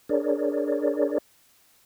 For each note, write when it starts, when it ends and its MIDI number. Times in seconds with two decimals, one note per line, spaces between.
0.09 1.18 62
0.09 1.18 68
0.09 1.18 70
0.09 1.18 73
0.09 1.18 74